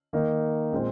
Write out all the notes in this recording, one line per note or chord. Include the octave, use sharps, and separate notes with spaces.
D#3 A#3 D#4
A#2 G#3 C4